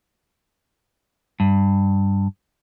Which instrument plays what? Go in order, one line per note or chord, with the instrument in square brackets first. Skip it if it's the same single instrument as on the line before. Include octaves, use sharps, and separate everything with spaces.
[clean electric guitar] G2